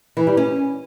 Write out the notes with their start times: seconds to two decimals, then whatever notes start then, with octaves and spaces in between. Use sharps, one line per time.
0.17 E3
0.27 G3
0.37 C#4